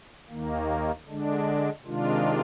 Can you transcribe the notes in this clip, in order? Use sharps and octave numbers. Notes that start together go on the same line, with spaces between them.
D#2 D#3 A#3
D3 G#3 D4
C3 D#3 G#3 D4 F4